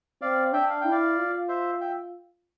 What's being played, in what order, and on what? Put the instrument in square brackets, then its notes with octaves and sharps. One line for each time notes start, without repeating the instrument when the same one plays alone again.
[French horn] C4 [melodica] D5 F5
[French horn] D4 [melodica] E5 G5
[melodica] F5
[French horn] E4 [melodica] G5
[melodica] D5 F5
[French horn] F4
[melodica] C5 E5
E5 G5